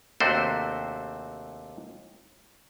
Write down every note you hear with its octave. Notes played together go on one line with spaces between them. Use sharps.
D#2 C3 A3 D4 F#4 C5